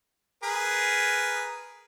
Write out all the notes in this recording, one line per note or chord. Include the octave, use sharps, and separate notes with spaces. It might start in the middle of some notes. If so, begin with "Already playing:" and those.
G#4 A#4 B4